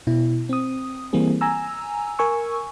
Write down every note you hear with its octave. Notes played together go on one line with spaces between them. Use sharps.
B2 E4
C4 D#6
E3 G3 A#3 C4 G#4
G#5 A#5 E6
A#4 G#5 C#6 E6